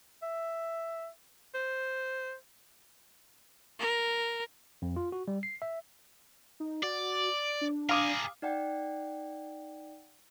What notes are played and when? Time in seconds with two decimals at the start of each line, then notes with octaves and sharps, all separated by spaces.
0.23 E5
1.54 C5
3.80 A#4
4.82 F2
4.96 F4
5.12 F#4
5.28 G3
5.43 C7
5.62 E5
6.60 D#4
6.83 F#4 D5
7.34 D7
7.61 D4
7.89 G#4 A#4 F5 D6 D#6
8.42 D#4 D5 F#5 G5